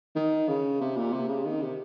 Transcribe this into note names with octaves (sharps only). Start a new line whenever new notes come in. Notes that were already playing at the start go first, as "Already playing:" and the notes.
D#3
C#3
C3
A#2
C3
C#3
D#3
C3